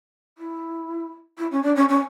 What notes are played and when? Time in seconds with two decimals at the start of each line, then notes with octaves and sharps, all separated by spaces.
0.38 E4
1.38 E4
1.51 C#4
1.63 D4
1.76 C#4
1.89 C#4